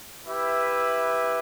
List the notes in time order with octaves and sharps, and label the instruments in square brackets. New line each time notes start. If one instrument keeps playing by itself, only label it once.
[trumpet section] E4 G4 B4 E5